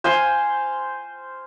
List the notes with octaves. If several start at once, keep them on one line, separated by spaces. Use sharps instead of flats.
C5 F5 G#5 C6